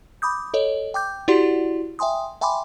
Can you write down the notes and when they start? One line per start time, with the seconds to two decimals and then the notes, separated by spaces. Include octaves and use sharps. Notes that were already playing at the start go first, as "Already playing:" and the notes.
0.22 B5 D6 D#6 G6
0.54 A4 C#5 D#5
0.94 G5 D6 G6
1.28 E4 F#4 G4 D5 F#5 C6
1.99 E5 G5 G#5 C6 D#6
2.41 E5 G5 G#5 B5 C6 D6